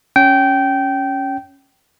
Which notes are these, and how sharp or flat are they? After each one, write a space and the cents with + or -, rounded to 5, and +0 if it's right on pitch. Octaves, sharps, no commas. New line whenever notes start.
C#4 +5 G5 -20